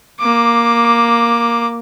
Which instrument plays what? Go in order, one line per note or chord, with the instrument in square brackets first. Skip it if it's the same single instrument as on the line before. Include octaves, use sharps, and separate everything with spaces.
[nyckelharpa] A#3 D6